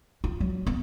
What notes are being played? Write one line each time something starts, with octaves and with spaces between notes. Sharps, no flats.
F4
F#3
B3